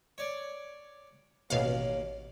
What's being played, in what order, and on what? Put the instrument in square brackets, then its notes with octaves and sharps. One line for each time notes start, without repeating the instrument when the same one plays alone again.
[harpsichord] C#5 D5
[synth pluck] A1 B2 F5 [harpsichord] D#2 [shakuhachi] C#5